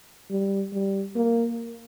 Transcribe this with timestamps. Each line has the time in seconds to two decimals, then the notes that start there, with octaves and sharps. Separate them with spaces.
0.31 G3
0.73 G3
1.16 A#3